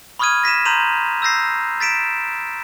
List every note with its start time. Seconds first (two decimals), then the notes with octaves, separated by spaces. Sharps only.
0.19 B5 C#6 D#6 F6 G#6 D#7
0.43 A#6 B6 D#7 E7
0.65 A#5 C6 G6 D#7 F7
1.22 E6 G6 A#6 C7
1.80 A6 B6 D7 E7